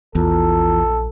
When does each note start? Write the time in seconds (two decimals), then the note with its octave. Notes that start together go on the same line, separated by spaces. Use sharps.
0.15 A#1 E2 F4 A4 A#5